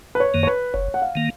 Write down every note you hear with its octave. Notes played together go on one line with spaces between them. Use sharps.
B4
C#5
F#2 D#3 A#3
C#5
B4
F#1 C#5
F#5
F5
D#3 A#3